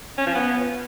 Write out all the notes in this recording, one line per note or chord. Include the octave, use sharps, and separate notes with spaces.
C#4
F3
B3